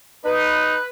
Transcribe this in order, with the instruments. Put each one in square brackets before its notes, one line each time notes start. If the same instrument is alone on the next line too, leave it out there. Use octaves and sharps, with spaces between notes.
[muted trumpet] D#4 [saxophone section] B4